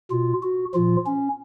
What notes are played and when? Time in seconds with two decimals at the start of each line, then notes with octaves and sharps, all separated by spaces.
0.11 B2 F4
0.43 F#4
0.74 A#2 F3 F4
1.06 C#4